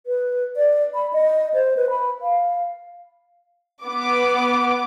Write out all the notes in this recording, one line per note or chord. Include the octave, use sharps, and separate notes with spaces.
B4
D5
B5
D#5
C5
B4
B5
F5
B3 D6